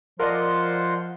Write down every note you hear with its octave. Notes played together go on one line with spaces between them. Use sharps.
F3 F4 A#4 D5 D#5 F#5 C6